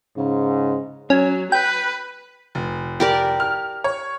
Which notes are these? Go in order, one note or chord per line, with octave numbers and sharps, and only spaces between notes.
G#2 C#3
F#3 C#4
B4 G5
F1
G4 A#4 D5
F6
C#5